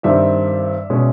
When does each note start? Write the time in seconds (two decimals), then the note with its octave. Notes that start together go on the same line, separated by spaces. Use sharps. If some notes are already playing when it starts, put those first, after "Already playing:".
0.03 G2 D#3 G3 C4 D5 E5
0.90 B2 G#3 C#4